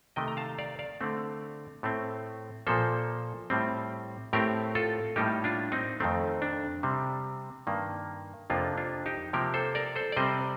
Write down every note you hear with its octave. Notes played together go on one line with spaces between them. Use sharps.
C3 D#3 A3 D#5 G5
A#5
F5 A5
D5 F5
D5 F5
D3 A3 C4
A2 A3 C4
A#2 F3 A#3 A4 C5
A2 G3 C4
A2 A3 C4 G4 A#4
F4 A4
A2 G3 A#3 D#4 G4
D4 F4
C4 D#4
F2 D#3 A3 C4
D4
C3 G3 C4
G2 D#3 A#3
F2 C3 F3 A#3 D4 F4
D4 F4
D#4 G4
C3 F3 A#3 G4 A#4
A4 C5
A#4 D5
A4 C5
D5
C3 G3 C4 C5 D#5